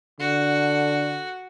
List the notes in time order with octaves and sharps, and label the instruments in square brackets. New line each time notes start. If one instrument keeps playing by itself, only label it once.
[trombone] D3 [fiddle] F#4